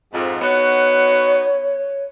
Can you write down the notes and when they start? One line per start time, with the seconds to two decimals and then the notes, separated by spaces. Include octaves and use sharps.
0.13 F2 G#2
0.41 B3 D#4 F#4 C#5